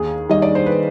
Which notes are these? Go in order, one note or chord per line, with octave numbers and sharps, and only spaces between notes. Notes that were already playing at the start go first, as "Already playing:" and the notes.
Already playing: D#2 G#4
D#3 G3 D#5
D5
C5
B4